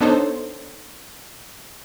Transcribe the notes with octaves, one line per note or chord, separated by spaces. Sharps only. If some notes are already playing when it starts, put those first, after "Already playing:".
B3 D4 D#4 A4 C5 C#5